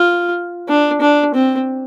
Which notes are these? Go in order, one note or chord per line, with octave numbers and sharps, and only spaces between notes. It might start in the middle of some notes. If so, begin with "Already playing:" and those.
Already playing: F4
D4
D4
C4